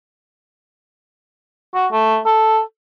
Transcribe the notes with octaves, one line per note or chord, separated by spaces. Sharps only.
F#4
A3
A4